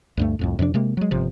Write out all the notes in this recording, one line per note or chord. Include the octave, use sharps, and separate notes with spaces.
D2 G2 A3
C2 F2 A2
F2 C3 F3 D4
C3 G#3 A#3
F#3 G#3
G1 C3 F3